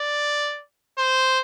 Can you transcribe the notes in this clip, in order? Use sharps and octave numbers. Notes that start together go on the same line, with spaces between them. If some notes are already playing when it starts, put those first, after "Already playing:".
Already playing: D5
C5